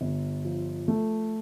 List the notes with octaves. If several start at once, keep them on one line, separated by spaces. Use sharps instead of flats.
G1
F3
A3